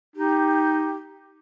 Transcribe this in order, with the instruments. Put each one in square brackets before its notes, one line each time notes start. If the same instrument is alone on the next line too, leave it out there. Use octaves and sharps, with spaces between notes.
[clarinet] D#4 [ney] G4